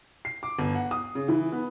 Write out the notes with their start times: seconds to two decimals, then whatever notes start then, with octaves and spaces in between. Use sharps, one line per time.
0.25 C7
0.43 D6
0.59 G1
0.75 F#5
0.91 D#6
1.15 C#3
1.28 E3
1.52 B3